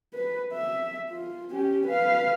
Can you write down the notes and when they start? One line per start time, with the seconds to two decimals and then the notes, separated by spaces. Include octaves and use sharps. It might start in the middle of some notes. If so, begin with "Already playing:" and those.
0.13 B4
0.53 E5
1.10 F4
1.52 C#4 G4
1.87 B4 F5